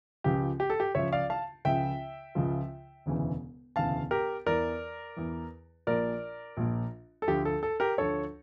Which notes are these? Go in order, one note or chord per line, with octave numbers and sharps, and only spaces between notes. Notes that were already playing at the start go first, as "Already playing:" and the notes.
C#2 C#3 F3 G4
G4
A4
G4
C#2 C#3 F3 C#5 E5
D5 F5
F5 A5
C#2 C#3 F3 E5 G5
C#2 C#3 F3
E1 D2 C#3 E3
E1 D2 C#3 E3 F5 A5
G4 A#4
E2 E3 A#4 D5
E2 E3
A#1 A#2 F3 A#4 D5
A#1 A#2 F3
A4
D2 D3 F3 G4
A4
A4
G4 A#4
D2 D3 F3 A4 C#5